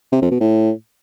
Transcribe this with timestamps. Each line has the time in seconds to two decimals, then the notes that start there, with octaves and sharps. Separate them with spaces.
0.12 C3
0.22 F2
0.31 B2
0.41 A2